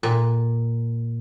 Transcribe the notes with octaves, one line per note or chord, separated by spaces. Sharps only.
A#2